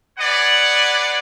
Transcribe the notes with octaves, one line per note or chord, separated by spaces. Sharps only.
G#4 B4 C#5 D5 F#5